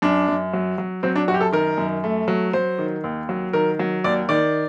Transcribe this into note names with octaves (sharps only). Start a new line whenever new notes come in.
F#2 D4
F#2
F#3
F#3
F#3 C4
D4
F#2 F#4
G4
A4
D#3 A#4
F#2
A3
F#3
F#3 C5
D#3
D#2
F#3
D#3 A#4
F#3
D#2 D5
D#3 D5